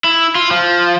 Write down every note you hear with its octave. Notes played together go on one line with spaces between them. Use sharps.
E4
F4
F3